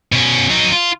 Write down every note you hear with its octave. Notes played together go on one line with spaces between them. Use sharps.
B2 C#4
F#3 D#4
F4